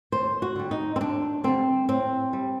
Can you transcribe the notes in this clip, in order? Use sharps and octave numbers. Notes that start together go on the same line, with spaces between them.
D#2 C5
F#4
D3 G3
D#4
C4
D#2 D4
D3 G3 C4
A2 C4
G3